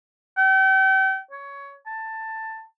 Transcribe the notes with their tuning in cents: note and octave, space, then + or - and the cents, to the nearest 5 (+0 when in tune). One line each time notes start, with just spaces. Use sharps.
G5 -40
C#5 +15
A5 +15